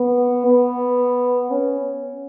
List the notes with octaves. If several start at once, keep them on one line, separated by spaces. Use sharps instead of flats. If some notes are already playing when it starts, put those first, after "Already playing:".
Already playing: B3
B3
C#4